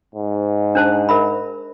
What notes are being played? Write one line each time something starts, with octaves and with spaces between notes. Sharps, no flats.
G#2
D4 C5 A5
A#4 E5 B5